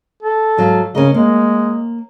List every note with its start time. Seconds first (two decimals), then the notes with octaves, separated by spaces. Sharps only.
0.22 A4
0.57 G#2 F#3 F5
0.95 C#3 C#4 A#4 D#5
1.14 G#3 A#3